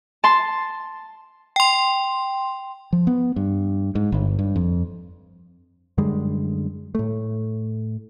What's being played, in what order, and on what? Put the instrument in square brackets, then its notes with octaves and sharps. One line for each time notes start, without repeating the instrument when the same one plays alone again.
[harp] A5 C6
[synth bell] G5 C6
[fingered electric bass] F3
B3
G2
G#2
G1
G2
F2
[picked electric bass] F#2 D3 G3 G#3
A2 A3